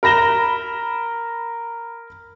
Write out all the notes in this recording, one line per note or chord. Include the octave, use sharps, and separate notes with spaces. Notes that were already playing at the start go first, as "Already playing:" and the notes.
A#4 B5 A#6 E7 G7